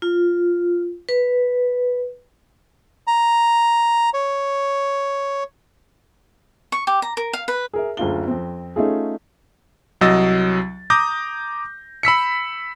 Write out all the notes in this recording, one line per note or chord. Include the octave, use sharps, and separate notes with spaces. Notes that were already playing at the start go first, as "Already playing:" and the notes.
F4
B4
A#5
C#5
C#6
G4
A#5
A#4
F5
B4
G#4 A#4 E5
F#1 D2 F4 G7
F2 C4
A3 C#4 D#4 F4 G#4
C2 F#3 D#5 E6 A6
A#5 D6 D#6 G6 A#6
B5 E6 B6 C#7